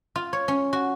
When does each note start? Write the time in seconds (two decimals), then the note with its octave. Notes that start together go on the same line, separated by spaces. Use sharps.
0.16 F4
0.33 C#5
0.48 C#4
0.73 F#4